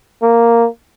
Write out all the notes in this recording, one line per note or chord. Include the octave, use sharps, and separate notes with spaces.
A#3